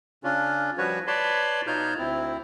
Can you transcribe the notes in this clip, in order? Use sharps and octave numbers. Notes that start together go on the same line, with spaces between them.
C#3 C#4 D4 F4
F3 G3 F#4 B4 C#5
B4 C#5 D5 A5 B5 C6
B2 D#4 F4 C#5 F6 G6
D2 C4 E4